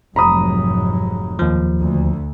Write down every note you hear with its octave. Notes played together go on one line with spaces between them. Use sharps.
F1 G#2 F#3 A#5 B5 D#6
D#2 F3
D2